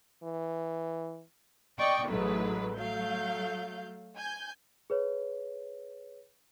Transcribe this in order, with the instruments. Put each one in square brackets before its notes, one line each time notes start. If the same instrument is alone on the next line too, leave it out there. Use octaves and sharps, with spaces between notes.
[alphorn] E3
[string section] D5 D#5 G5 C#6
A1 G#2 F#3 A3 B4
F#3 A3 F5 G6
G#5 G6
[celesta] G#4 B4 C#5